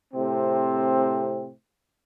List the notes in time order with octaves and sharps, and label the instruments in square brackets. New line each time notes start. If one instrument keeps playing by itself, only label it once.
[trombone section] A2 C3 C4